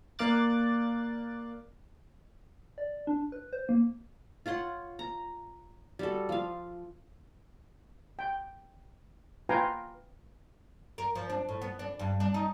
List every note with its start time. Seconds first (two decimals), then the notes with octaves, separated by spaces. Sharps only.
0.19 A#3 D5 F5 D6 F#6 A6
2.78 D5
3.07 D4
3.32 B4
3.53 C5
3.69 A#3
4.46 F4 C#5 F#5 C6
4.99 A#5
5.99 G3 F#4 A4
6.29 F3 F5
8.19 G5
9.49 F4 B4 F5 G5 G#5 A#5
10.98 A#4
11.15 F3
11.30 D4
11.49 A2
11.62 B3
11.79 D4
11.99 G2
12.20 D4
12.34 D#4